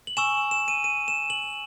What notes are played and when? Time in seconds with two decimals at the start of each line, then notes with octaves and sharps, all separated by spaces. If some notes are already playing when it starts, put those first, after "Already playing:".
0.07 F#7
0.17 G#5 C#6 E6 E7
0.51 E7
0.68 D#7
0.84 D#7
1.08 E7
1.30 F#7